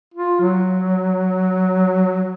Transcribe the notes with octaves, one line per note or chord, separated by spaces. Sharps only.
F4
F#3